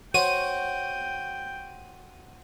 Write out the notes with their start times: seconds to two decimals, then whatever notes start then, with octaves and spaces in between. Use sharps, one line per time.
0.14 F#4 C5 C#5 G5 D#7